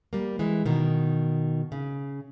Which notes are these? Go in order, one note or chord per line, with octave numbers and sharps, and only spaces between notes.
G3 A#3
E3 G#3
B2 D#3
C#3